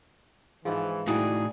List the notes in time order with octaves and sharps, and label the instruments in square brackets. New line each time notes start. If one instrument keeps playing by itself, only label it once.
[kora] G#2 F3 [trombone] E3 [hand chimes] G#4
[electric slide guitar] A2 D#4 F#4 [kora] G3 D5 [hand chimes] E4 [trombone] G#4